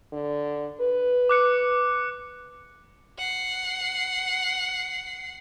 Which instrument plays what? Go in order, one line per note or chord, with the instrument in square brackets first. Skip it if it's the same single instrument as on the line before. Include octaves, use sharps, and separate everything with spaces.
[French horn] D3
B4
[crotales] D6 F#6 C#7
[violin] F#5 C7